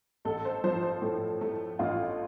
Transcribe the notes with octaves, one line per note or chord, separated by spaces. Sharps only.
A1 A4
C5
F3 C5
C5
A2
A3
A1 F4